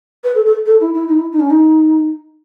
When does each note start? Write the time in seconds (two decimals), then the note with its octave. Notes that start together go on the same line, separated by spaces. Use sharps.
0.24 B4
0.35 A4
0.46 A4
0.66 A4
0.80 E4
0.94 E4
1.08 D#4
1.19 E4
1.32 D#4
1.40 C#4
1.50 D#4